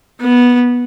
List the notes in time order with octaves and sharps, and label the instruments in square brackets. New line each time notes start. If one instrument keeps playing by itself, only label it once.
[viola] B3